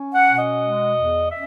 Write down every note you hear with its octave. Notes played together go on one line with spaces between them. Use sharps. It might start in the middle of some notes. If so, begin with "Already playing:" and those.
Already playing: C#4
F#5
B2
D#5
G#3
E2
C#4 E5